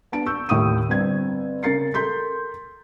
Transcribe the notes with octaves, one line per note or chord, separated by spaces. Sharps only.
B3 D4 A5 D7
C#6 E6 G6
D#2 A2 C#6 D#6 D#7
G1 C4 G#6
C#3 A#4 A6 C7 C#7
A4 A#4 C6 G6 B6